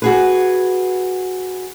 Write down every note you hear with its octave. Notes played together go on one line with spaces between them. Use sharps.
F#4 G#4 B4